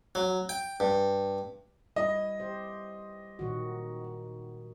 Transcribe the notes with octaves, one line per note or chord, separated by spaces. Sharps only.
F#3
G5
G2
G3 E4 D#5
G4 C5
A#2 D#3 F#4